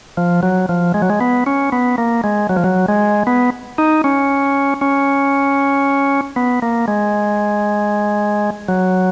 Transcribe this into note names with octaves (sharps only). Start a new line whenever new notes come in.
F3
F#3
F3
G#3
F#3
G#3
B3
C#4
B3
A#3
G#3
F#3
F3
F#3
G#3
B3
D#4
C#4
C#4
B3
A#3
G#3
F#3